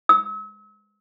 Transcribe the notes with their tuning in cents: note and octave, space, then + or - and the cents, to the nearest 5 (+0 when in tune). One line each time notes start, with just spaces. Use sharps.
E6 -40